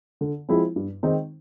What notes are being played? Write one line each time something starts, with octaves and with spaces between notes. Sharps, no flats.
D3
F3 G#3 C4 E4
G2
D#3 G#3 C4 D#4